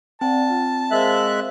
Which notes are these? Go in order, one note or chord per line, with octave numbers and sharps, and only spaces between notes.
C4 D5 F#5 A5
F4
G#3 A#4 C5 E5 F5 F#6